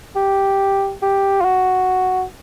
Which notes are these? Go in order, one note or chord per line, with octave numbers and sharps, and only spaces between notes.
G4
G4
F4
F#4